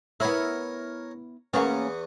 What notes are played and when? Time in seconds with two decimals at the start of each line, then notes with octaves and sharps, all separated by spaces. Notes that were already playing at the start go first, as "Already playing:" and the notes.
0.20 B3 E4 A#4 C#5 G#5
1.53 E2 A#3 B3 C#4 C#6